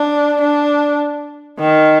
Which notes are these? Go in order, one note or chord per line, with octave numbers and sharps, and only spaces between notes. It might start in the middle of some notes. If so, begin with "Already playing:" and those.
Already playing: D4
D4
D#3